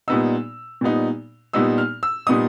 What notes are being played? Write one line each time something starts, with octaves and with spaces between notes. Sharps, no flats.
A#2 G3 B3 D#4 E6
A#2 G3 B3 D#4
A#2 G3 B3 D#4 E6
F6
E6
A#2 G3 B3 D#4 D#6